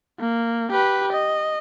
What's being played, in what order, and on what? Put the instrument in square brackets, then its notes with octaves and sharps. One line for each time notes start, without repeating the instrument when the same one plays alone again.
[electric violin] A#3
G4 B4
D#5